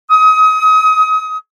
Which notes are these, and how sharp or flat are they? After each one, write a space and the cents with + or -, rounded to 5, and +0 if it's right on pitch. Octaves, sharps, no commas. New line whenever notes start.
D#6 +30